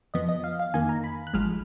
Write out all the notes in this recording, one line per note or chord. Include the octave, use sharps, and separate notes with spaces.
F2 F3 B3 D#5
D#5
F5
F5
F2 D#3 A#3 G#5
A#5
B5
F#6
G#1 G#2 F3 G#3 F6